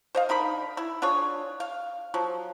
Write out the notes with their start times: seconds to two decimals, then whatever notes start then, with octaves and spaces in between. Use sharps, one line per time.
0.15 C5 D#5 F5
0.29 D3 D#4 A#4 B5
0.77 E4
1.02 D4 F4 G#4 C#5
1.60 F5
2.14 F3 F#3